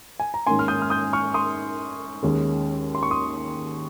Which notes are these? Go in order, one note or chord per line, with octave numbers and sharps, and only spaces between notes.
G#5
A#5
G#2 D#3 A#3 C#4 G#5 C6
F6
D#6 G6
F6
D#6 G6
C#6 F6
C6 D#6
D#2 D#3 G#3 C#4
C6
C#6
C6 D#6